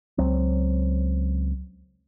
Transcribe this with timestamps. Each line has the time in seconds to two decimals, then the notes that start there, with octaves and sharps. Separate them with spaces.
0.18 C#2 F#3 C4